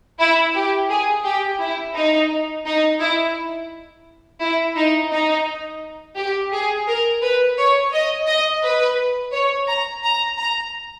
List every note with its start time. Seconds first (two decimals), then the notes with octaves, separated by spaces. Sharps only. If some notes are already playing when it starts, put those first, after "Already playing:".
0.20 E4
0.55 G4
0.89 G#4
1.25 G4
1.59 E4
1.95 D#4
2.66 D#4
3.00 E4
4.41 E4
4.76 D#4
5.11 D#4
6.16 G4
6.52 G#4
6.87 A#4
7.22 B4
7.58 C#5
7.92 D#5
8.27 D#5
8.63 B4
9.32 C#5
9.68 A#5
10.03 A#5
10.38 A#5